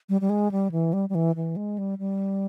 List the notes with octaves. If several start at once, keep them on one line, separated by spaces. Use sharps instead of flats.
G3
G3
G#3
G3
E3
G3
G3
E3
E3
G#3
G3
G3